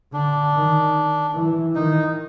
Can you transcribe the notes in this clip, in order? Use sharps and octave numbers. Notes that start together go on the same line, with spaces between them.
D3 D4
D#3
E3
D#3 D#4